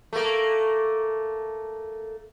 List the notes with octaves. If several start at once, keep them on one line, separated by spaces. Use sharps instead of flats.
A3 A#3